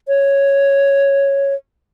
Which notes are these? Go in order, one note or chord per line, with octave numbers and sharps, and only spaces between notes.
C#5